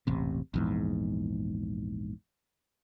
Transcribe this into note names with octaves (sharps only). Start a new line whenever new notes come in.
E1 A1 C3
A#1 E2 G#2